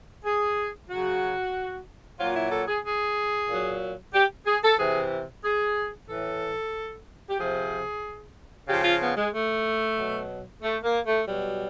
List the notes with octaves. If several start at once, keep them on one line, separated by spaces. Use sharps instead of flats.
G#4
C#3 F#3 F#4
A#2 F#3 F4
E4
A4
G#4
G#4
A#2 F#3
G4
G#4
A4
C3 E3 G#4
G#4
A2 E3 A4
G4
C3 F3 G#4
C#3 F3 G4
F4
B3
G#3
A3
B2 F#3
A3
A#3
A3
B2 F#3 G3